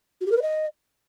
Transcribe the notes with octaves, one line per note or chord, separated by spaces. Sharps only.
F#4
G4
A#4
B4
D#5